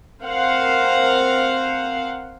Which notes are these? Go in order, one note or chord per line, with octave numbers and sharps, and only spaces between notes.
C4 A#4 C5 F5 F#5